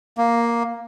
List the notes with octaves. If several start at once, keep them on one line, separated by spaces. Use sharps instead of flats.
A#3